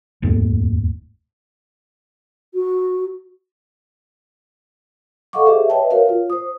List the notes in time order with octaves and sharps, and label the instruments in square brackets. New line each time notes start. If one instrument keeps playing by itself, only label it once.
[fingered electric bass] F1 D#2 G#2 A3
[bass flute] F#4
[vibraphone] A4 D#5 F5 F#5 C#6 D6
G4 G#4 C5 E5
B4 C#5 D#5 E5 G5 A5
F#4 A#4 C#5 F5
F4
C5 D#6